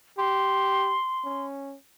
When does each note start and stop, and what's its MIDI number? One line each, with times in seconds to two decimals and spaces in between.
0.18 0.97 67
0.18 1.45 84
1.25 1.75 61